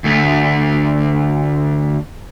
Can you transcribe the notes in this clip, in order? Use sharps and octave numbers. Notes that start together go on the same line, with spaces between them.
D2 A3